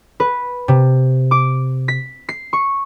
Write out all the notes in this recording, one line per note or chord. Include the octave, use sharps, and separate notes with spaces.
B4
C3
D6
B6
C7
C#6